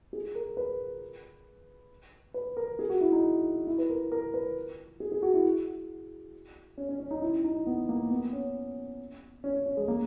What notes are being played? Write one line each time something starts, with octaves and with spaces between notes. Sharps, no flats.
G#4
A#4
B4
B4
A#4
G#4
F#4
E4
D#4
E4
B4
A#4
A#4
B4
G#4
G#4
F#4
E4
C#4
C#4
C#4
D#4
E4
D#4
B3
A#3
B3
C#4
C#4
C#4
C#4
G#3
A#3